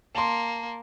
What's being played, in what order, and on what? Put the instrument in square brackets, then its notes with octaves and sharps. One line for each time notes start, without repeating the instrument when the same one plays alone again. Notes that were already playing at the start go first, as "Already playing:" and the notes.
[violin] A#3 [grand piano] A5 C6